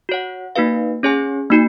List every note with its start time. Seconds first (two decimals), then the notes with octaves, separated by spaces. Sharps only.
0.09 F#4 C#5 F#5
0.56 A#3 D#4 F#4 B4 F5
1.03 C#4 G#4 C#5 G#5
1.50 A#3 D#4 F#4